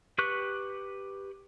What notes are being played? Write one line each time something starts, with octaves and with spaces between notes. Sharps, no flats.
G4 B4 C#6 F#6